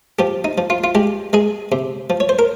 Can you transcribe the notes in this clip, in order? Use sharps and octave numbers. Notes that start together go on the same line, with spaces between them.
F3 G4
D#4
F3
F4
F4
G#3 G4
G#3 G#4
C3
F3
C#5
C5
A#4